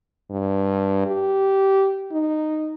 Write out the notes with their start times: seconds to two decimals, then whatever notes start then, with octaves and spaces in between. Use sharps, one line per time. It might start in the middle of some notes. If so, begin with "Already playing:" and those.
0.31 G2
1.06 G4
2.12 D#4